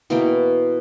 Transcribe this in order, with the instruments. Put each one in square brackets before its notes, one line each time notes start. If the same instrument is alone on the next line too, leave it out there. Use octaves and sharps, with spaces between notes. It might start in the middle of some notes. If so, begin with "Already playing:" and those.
[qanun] B2 E3 A#3 G5